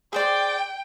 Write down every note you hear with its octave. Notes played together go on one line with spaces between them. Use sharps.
G#4 C5 D5 G5